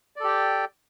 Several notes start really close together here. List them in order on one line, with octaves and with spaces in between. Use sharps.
D5 A4 G4 G5